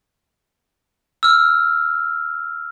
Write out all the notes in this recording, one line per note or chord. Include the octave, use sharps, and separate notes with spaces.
E6 F6